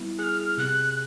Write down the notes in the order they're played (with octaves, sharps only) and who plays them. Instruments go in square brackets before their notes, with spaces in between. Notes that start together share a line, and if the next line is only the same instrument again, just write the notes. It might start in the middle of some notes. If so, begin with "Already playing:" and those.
Already playing: [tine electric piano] G3 B3 E4
[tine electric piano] G#4 [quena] F#6
[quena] F6
[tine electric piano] C3 [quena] F#6